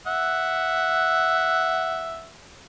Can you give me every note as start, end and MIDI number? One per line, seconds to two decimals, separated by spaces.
0.07 2.27 76
0.07 2.27 78